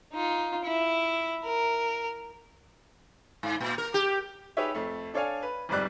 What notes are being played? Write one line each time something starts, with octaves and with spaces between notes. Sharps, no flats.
D#4 F4
E4
A#4
G#2
A#2
A#4
G4
D#4 G4 G#4 B4 C#5 E5
F2 A3
D4 A4 C#5 D5 F5 G#5
B4
G1 F2 G#2 G3 D5 F#6